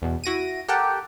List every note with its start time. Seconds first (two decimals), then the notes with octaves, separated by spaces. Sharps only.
0.02 E2 B2
0.24 E4 F#4 A#6 D7 D#7
0.68 G4 A4 A#4 F#5 G5 A5